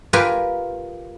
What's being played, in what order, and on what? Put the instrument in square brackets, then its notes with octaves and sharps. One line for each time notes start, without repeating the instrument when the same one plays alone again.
[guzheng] F4 G4 A#4 B4 G#5